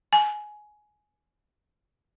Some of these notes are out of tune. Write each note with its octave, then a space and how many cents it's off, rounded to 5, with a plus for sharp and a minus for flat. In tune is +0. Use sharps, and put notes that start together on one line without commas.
G#5 +15